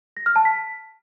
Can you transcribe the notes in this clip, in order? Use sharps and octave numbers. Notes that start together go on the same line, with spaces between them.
A#6
F6
A5
B6